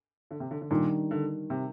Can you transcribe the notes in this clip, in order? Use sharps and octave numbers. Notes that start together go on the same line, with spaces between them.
D3
C3
D3
D3
A#2 D#3 G3 D4
D3
C3